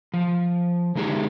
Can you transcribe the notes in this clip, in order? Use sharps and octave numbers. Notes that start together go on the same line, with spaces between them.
F3
D3 G#3 D#4 G4 G#4